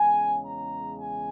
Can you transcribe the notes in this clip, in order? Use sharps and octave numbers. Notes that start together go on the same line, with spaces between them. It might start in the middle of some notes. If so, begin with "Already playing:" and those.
Already playing: E2 C#3 G#3 C#4 G#5
A#5
G#5